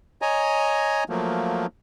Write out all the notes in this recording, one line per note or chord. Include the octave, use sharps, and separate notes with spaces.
C#5 D#5 G#5 A#5
F3 F#3 A3 A#3